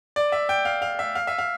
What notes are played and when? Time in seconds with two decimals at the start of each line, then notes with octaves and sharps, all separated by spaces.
0.16 D5
0.32 E5
0.49 G5
0.65 F5
0.82 F5
0.99 E5
1.15 F5
1.27 E5
1.38 F5